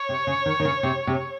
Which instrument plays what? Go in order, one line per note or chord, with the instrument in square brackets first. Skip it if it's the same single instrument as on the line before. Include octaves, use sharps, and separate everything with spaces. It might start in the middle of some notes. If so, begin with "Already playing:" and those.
Already playing: [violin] C#5
[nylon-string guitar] C3
C#3
D#3
D#3
C#3
C3
C3